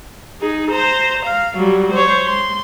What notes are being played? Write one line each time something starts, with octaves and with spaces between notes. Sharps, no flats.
D#4 G#4
C5 A#5
F5
F#3 G3
C5 C#5
C6